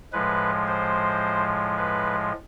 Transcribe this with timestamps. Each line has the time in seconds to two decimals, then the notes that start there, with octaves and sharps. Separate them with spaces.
0.12 A2 F3 G#3 B4
0.67 C5
1.77 B4